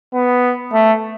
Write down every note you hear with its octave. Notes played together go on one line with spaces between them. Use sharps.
B3
A3